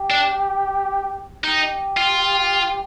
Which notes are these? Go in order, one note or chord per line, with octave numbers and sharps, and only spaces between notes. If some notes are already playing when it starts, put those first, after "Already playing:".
Already playing: G4
D4
D#4 G4
F4